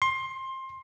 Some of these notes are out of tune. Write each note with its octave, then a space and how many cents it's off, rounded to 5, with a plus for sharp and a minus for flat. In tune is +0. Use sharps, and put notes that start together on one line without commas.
C6 +20